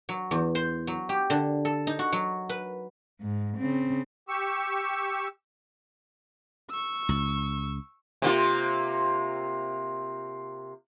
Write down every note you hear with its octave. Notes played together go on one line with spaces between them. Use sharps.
F#3
E2
C5
F#3
G4
D3
A4
D#4
F#4
F#3
B4
G#2
C#3 C4
G4 C#6 E6
C#6 E6
C#2
C3 A#3 F4